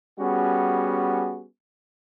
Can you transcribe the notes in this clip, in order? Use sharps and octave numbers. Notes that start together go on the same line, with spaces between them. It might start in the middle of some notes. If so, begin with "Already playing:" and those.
G3 B3 C#4 F#4 G#4